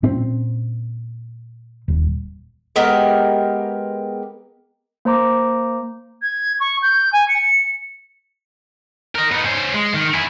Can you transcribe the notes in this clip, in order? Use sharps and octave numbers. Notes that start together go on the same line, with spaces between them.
A#2 C4 C#4
D#1
G#3 B3 G4 A#4
A#3 C5 A#5 D6
G#6
C#6
G6
G#5
C#7
A#4 D#5
B3 D#4
C#4 C5
G#3
D#3
E4 G#4